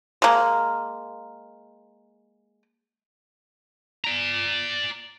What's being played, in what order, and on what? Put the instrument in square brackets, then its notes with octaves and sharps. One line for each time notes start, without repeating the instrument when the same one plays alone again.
[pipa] G#3 A#3
[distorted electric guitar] D5 A#5